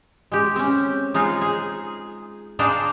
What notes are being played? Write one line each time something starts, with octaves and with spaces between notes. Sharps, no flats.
G#3 G4
C4 C#4
G#3 D#4 F4 F5 G#5
G#4
D4 D#4 G#4 C5 F5 G5